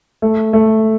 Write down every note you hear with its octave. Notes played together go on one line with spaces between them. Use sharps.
A3
A3